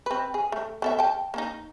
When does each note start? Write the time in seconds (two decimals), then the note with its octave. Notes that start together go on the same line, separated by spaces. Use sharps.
0.06 C4 B4
0.34 G#4
0.52 A3
0.82 B3 A4 E5
0.99 G5 A5
1.34 A#3 D4 D#4